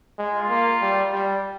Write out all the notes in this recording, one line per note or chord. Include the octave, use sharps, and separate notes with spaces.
G#3
F4
A#3
G3
G3